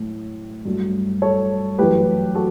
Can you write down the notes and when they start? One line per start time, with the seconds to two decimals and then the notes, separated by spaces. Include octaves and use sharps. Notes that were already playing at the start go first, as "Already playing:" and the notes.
Already playing: A2 F#3 A3
0.65 G2 F#3 A3
1.22 A4 C#5
1.78 F#2 E3 A3 G4 B4
2.35 F#4 A4